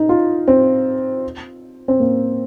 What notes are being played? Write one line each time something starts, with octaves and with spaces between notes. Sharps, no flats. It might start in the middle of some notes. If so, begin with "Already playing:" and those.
Already playing: D#4
F4
C4
C4
A#3